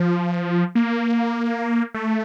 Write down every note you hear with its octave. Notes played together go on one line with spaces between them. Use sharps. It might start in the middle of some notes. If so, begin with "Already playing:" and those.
Already playing: F3
A#3
A3